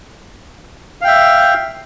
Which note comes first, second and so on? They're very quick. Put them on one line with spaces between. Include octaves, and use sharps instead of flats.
F5 G5 E5